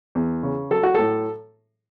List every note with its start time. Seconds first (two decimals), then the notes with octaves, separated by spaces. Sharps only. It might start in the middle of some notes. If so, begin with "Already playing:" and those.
0.15 E2
0.43 C#3
0.71 F#3 A4
0.83 F#4
0.94 A2 A4